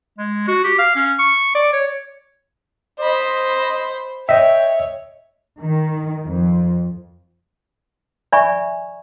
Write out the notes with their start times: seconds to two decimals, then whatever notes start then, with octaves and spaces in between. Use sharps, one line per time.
0.18 G#3
0.48 F#4
0.64 G4
0.78 F5
0.95 C#4
1.18 C#6
1.55 D5
1.73 C#5
3.00 C5 D#5 B5
4.29 C#5 D#5 E5 G5
5.60 D#3
6.26 F2
8.33 D5 E5 G#5 B5 C#6